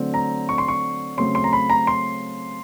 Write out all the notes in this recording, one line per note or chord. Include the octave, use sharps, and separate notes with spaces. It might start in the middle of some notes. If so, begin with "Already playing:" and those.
Already playing: D3 F#3 A3 C4
A#5
C#6
C6
C#6
C#3 F#3 A3 C4 C6
C6
A#5
B5
A#5
C6